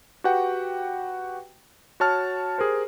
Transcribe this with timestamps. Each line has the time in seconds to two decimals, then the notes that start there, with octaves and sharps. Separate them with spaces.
0.24 F#4 G4 B4 F#5 G5
2.00 F#4 C#5 A5 F6
2.58 G4 G#4 A#4 C5